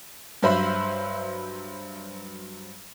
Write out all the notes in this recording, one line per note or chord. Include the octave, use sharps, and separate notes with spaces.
G2 F#3 C5 E5 B5